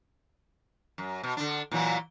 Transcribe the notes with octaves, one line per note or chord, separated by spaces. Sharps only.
F#2
B2
D3 D4
A#2 E3 F#3